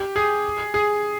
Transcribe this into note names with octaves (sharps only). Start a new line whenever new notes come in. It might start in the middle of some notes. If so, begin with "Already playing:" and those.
Already playing: G4
G#4
G#4